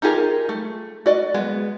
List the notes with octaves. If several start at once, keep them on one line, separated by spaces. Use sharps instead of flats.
D#4 F4 G4 G#4 A#4
A3
F#4 D5 D#5
G#3 B3